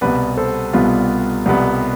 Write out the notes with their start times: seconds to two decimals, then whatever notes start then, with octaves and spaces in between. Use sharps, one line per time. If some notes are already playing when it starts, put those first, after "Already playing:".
0.01 C2 B2 G3 B3 B4 D5
0.37 A4 C5
0.73 C2 B2 G3 B3 F4
1.46 C2 B2 G3 B3